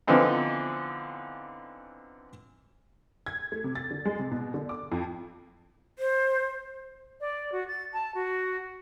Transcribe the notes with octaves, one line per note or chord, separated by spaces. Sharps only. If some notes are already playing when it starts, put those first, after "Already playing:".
D3 E3 F3 B3 C4 D#4
G#6
A3
C3
A6
D3
G#3
C3
B2
D3
D6
F2
C5
D5
F#4
A6
A5
F#4